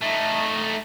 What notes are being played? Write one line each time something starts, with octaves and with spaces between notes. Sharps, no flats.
A3 D#4